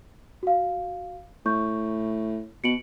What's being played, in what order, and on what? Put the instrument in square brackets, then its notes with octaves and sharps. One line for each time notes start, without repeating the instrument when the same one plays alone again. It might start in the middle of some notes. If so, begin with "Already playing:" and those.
[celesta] F#4 F5
[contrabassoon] A2 [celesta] C#6 G6
[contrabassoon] B2 [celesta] C#7 D7 F#7